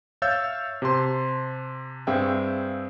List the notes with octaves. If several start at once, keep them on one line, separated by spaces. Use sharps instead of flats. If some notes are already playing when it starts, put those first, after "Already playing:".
C#5 E5 F5 E6 G6 A6
C3 G4 C5 A5 C6
G2 C4 G#4 E5 F5 G5